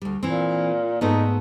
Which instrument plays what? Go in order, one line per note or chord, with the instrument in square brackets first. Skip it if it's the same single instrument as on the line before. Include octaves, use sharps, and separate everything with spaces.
[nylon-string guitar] D2 G3
[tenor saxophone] A#2 [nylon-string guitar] E3 C4
[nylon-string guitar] G#2 A3 B3 [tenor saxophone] D#4